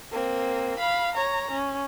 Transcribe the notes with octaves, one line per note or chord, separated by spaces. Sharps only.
A#3 C4
F5 B5
C#5 A#5
C#4